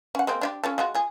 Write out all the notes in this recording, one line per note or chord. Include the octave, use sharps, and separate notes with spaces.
C#4 F#5
G#3 A#3 C4
D4 E4 G4
C#4 F4 A4
G#3 F4 F#4
F4 G#4